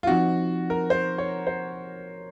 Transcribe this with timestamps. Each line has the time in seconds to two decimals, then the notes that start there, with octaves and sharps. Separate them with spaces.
0.03 F4
0.07 F3 C4 D#4 F#4
0.70 A#4
0.90 C5
1.18 C#5
1.47 C5